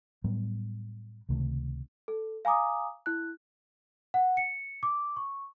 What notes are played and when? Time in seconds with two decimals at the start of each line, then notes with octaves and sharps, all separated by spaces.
0.24 A2 F#3 G3 B3
1.29 C#2 C3 D#3 A3
2.08 A4
2.45 F5 G#5 A#5 D6 D#6
3.06 E4 F#6
4.14 F#5
4.37 C#7
4.83 D6
5.17 C#6